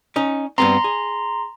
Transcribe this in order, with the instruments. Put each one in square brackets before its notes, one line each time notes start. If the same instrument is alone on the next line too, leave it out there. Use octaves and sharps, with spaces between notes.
[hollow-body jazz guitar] C#4 D#4
[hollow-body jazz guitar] G2 B3 C4 [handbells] A#5 C6
[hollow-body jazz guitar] G#4